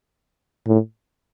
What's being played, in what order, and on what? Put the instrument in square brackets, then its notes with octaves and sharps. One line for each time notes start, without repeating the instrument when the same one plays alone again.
[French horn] A2